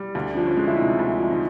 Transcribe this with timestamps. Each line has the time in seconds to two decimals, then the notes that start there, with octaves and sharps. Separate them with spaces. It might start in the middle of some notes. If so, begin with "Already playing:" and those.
Already playing: G3
0.15 D2
0.35 F3 D4
0.47 C#4
0.57 G#3
0.68 E4
0.78 C3 D#4
0.99 D2
1.20 F3
1.31 D#4